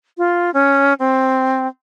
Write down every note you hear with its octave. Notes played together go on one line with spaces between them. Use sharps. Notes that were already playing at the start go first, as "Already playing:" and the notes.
F4
C#4
C4